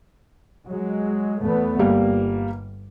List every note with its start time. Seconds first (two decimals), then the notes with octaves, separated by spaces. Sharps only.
0.68 F#3 G#3
1.41 E2 A3 B3
1.79 G1 G3 A#3